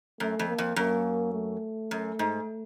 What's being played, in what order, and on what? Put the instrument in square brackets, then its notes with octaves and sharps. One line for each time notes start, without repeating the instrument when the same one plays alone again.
[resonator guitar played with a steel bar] F#2 [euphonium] A3
[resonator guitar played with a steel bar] F2
[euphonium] A#3
[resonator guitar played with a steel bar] F2
[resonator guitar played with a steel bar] F#2 [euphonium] A#3
[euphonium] A3
[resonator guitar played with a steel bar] F#2
G#2